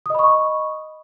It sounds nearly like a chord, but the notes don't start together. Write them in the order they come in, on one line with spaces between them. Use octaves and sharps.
D#6 D#5 B5 C#6